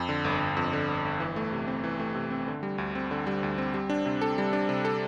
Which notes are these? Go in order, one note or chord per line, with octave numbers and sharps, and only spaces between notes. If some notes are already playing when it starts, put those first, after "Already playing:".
Already playing: F2
D3
G1
G1
F2
D3
G1
G1
E3
A3
C3
C4
E3
A3
C3
C4
D3
G3
D2
C4
D3
G3
D2
C4
G3
D4
C3
A4
G3
D4
C3
A4